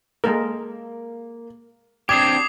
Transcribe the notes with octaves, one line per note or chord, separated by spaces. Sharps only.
G#3 A#3 A4 A#4
C4 D4 G4 D6 D#6 G#6 C7